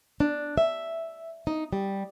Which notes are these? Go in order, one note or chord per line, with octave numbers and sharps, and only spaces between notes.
D4
E5
D#4
G3